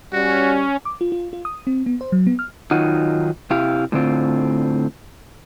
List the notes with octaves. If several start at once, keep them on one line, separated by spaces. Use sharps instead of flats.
G3 C#4 F#4
D6
F4
F4
F4
D#6
C4
B3
C5
F#3
B3
F6
D#3 F#3 D#4 F4 F#5
C3 E4 G4 F5
A2 D3 C4 F4